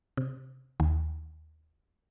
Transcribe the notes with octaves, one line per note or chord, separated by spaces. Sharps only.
C3
D#2